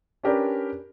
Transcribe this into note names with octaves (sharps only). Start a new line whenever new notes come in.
C#4 D4 G4 A#4 B4 D5